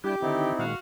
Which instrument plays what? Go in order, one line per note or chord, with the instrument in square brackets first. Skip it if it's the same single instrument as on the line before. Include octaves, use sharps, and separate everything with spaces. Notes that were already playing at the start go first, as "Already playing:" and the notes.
[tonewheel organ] G3 D4 E4 [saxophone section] G4
[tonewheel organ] D3 D#3 [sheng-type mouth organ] C4 D#4 E4
[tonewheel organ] A#2 D#3 G#3 [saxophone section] F#4 F5